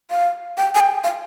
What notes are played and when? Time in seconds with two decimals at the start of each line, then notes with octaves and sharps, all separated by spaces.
0.11 F5
0.58 G5
0.75 G#5
0.80 G5
1.04 F5